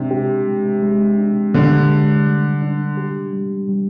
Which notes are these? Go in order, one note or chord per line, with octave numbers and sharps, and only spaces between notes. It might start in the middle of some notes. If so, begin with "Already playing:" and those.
Already playing: C3 G#3 D4
G4
G#3
G#3
D4
D3 G4
G#3
G3
D4
G4
G3
G3